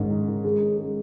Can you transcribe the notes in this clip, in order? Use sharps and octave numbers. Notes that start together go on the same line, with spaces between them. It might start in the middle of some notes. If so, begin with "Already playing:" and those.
Already playing: G#2 D#3 C#4
D#3
D#3
G#3
C#4
G#3